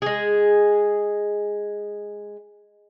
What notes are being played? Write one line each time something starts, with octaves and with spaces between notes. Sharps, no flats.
G#3 G#4